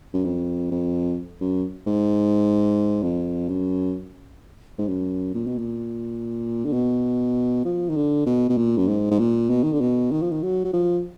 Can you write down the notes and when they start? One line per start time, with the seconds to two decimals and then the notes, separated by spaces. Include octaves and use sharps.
0.13 F#2
0.24 F2
0.71 F2
1.40 F#2
1.86 G#2
3.02 F2
3.48 F#2
4.78 G#2
4.87 F#2
5.34 A#2
5.46 B2
5.58 A#2
6.65 D3
6.72 B2
7.65 F3
7.89 D#3
7.96 D3
8.26 B2
8.49 B2
8.57 A#2
8.77 F#2
8.88 G#2
9.11 G#2
9.19 A#2
9.49 B2
9.63 D#3
9.72 D3
9.81 B2
10.11 D#3
10.21 F3
10.31 D#3
10.42 F#3
10.64 F#3
10.73 F3